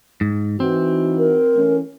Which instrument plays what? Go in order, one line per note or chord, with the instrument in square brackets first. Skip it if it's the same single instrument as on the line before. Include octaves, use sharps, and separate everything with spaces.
[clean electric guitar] G#2
[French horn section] E3 D#4 F#4 [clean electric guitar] C4
[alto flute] A#4
[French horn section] E3 A3 C#4